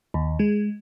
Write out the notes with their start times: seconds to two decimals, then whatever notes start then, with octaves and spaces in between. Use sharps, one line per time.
0.14 D#2
0.39 G#3